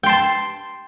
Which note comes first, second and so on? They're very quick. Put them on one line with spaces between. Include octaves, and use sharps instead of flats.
G5 C6 A5